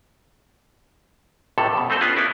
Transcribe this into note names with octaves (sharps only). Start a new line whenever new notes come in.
C#2 A2 C3 A4
F2 B2
A3 C4 D#4 A4 C5 D#5
B3 C#4 D4 F4 G#4
A#3 B3 D#4 E4 D5